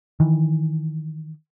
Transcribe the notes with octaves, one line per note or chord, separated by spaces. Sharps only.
D#3 E3